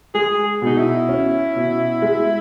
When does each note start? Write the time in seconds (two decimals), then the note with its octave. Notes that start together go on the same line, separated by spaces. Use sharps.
0.15 G#3 G#4
0.62 B2 D#4
0.77 E4
1.09 C#4
1.56 B2
2.02 G#3